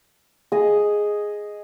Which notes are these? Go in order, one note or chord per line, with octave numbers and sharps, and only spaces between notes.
G#4 D#5